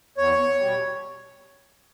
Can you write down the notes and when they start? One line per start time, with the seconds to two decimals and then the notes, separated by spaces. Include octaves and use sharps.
0.17 E2 C#5
0.59 B2 G3